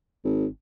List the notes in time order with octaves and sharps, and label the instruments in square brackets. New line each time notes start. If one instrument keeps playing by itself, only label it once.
[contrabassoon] G#1